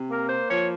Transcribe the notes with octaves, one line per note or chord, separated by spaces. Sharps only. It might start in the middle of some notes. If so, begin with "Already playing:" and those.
Already playing: C3
A#3 A#4
C5
F3 C#5